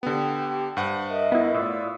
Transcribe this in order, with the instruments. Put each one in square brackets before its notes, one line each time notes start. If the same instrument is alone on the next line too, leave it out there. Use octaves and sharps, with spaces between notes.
[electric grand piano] D3 B3 [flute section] G4 G5
[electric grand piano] G2 F#5 [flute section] C5
[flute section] A#4 D#5 E5
[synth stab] B3 E4
[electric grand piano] A2 [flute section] F4 D5 E6